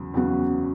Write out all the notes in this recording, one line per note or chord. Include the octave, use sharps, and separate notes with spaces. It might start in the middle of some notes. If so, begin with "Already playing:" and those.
Already playing: E2 C#3 F#3
E2 C#3 F#3 B3 F#4